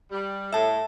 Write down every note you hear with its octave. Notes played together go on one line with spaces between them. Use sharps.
G3
A2 E5 A5